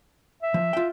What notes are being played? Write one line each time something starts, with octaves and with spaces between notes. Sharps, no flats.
E5
F3
F4 G5